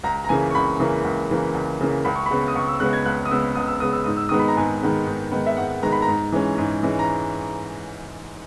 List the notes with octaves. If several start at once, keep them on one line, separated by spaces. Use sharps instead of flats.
C#2 A#5
A#5
C#3 E3 A#3 G#5
C#6
C#2 B5
C#3 E3 A#3
C#2
C#3 E3 A#3
C#2
C#3 E3 A#3
C#2 B5
C#6
B5
C#3 G#3 B3
D#6
C#2 C#6
E6
C#3 G#3 B3 F#6
G#6
C#2 F#6
D#6
C#3 G#3 B3 E6
C#2 D#6
E6
C#3 G#3 B3 D#6
E6
G#2 D#6
E6
D#3 G#3 B3 D#6
B5
A#5
G#2 G#5
D#3 G#3 B3
G#2
D#3 G#3 B3
E5
G#2 F#5
D#3 G#3 B3 A#5
B5
A#5
G#2
E3 G#3 C#4
G#2
E3 G#3 C#4
A#5